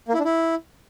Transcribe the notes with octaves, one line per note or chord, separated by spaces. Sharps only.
A#3
E4
D4
E4